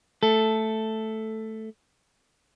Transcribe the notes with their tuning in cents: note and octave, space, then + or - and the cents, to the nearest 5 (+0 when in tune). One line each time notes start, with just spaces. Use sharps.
A3 +0 A4 +0